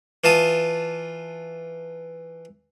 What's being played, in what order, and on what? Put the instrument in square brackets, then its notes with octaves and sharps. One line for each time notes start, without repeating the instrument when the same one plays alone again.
[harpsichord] E3 F4 A5 D#6